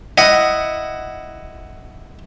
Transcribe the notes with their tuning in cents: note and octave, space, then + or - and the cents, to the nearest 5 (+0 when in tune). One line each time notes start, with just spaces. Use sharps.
E4 +0 D#5 +0 F#5 +10